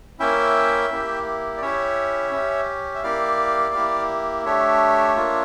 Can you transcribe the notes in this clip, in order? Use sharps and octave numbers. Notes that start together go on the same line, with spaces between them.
A#3 C#4 E4 E5 G5
A#3 E4 G4
D5
C#4 E4 G4 C#5 E5
C#4 G4
E5
A#3 E4 G4 D5 F5
A#3 E4 G4
A3 D4 G4 C#5 E5
A#3 D4 F4